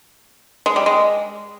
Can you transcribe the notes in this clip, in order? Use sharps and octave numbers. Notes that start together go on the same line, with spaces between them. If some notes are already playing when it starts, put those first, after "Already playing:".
G#3
G3
G#3